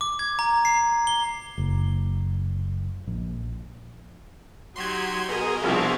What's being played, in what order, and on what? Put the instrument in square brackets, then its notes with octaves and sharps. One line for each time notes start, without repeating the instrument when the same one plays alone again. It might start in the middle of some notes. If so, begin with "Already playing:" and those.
[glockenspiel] D6
G#6
A#5
C7
G7
[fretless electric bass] F#1
A#1
[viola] F#3 D#4 [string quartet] F#4 G4 [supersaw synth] C6 G#6
[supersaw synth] B2 G#4 [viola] A#4 D#5
[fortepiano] C2 F3 [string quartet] C4 D4 F#4 [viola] E5 F5